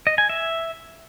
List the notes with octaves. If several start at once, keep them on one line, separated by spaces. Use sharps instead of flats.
D#5
G#5
E5